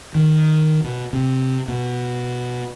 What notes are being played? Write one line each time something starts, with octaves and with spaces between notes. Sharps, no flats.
D#3
B2
C3
B2